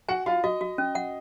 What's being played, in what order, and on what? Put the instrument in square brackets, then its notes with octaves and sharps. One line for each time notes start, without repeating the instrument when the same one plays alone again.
[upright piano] F#4 F#5 [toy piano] G#5
[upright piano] F4 F5 [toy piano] F#4
[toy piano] F#4 [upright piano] D#5
[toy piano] F#4
C#4
F#5